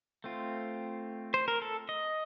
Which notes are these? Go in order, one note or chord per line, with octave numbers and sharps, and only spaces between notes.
A3 C4 F4
C5
A#4
A4
D#5